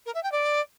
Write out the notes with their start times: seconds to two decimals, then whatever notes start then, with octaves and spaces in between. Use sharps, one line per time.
0.06 A#4
0.15 E5
0.23 G5
0.32 D5